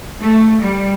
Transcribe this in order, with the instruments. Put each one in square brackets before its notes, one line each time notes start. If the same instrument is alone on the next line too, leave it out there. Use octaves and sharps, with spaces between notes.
[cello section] A3
G3